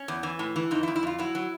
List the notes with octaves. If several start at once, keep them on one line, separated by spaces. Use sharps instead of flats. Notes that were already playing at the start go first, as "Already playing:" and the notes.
Already playing: C#4
E2
E3
A2
E3
F2 D#4
E4
F2
E4
F2 F4
F#3 E4
F#3